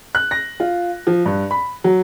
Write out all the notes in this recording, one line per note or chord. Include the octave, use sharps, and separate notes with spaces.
F#6
A#6
F4
F3
G2
B5
F#3